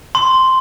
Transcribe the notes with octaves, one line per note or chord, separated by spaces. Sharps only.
C6